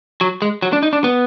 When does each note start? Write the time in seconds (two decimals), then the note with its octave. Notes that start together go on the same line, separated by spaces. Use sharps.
0.21 F#3
0.42 G#3
0.62 F#3
0.73 D4
0.83 D#4
0.93 D4
1.04 B3